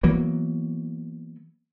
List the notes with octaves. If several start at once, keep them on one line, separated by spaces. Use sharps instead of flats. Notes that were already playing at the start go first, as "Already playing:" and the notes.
E3 F#3 A#3 B3